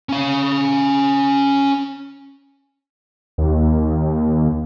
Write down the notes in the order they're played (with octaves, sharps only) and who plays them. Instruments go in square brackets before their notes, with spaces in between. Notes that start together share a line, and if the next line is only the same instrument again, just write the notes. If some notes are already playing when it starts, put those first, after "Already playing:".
[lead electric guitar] C#4 F5
[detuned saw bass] D#2